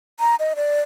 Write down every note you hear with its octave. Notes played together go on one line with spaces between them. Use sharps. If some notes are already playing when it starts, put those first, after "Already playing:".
A#5
D#5
D5